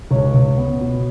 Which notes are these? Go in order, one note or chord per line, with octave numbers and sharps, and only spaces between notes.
C#2 C#5
C#2
B3
B2